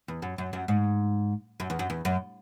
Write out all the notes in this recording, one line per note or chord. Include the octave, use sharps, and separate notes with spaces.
E2
F#2
F#2
F#2
G#2
F#2
E2
F#2
E2
F#2